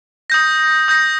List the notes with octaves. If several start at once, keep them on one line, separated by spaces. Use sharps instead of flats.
D#6 G6 A#6
D#6 G6 A#6